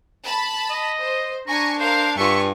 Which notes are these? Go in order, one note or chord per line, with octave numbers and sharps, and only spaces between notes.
A5 B5
D#5
C5
D4 G#5 A#5 C#6
A#4 C5 F5
G2 F4 E5 G#5 C#6